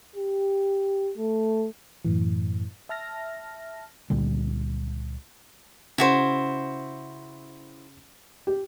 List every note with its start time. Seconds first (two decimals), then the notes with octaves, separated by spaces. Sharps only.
0.16 G4
1.18 A3
2.05 F#2 A2 E3
2.89 E5 A5 F6 A#6
4.10 C#2 A#2 D3 G3
5.98 C#3 E4 F#4 C5
8.47 G4